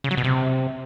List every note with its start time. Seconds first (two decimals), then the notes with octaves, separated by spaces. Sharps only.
0.04 C#3
0.11 F#3
0.17 B2
0.24 C3